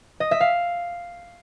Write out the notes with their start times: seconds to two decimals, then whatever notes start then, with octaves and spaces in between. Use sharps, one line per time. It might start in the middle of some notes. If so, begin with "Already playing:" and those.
0.20 D#5
0.31 E5
0.41 F5